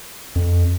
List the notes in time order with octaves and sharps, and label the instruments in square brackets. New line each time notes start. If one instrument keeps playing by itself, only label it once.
[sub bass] F2